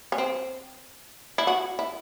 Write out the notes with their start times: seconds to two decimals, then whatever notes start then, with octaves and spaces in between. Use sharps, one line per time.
0.12 C#4
0.18 C4
1.38 E4
1.47 F#4
1.79 E4